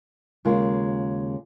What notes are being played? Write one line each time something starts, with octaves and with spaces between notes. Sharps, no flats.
D#2 C#3 G#3 F4 A#4 F5